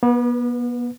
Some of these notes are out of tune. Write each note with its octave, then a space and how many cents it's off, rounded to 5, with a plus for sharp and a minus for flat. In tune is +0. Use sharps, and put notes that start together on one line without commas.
B3 -35 B4 +0